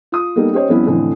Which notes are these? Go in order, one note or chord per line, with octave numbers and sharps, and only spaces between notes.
F4 D#6
G3 A#3 B3 D#4 G4 A4
C#4 G4 C5 C#5 D#5
F2 G3 B3 C#4 E4
F2 A2 D3 E3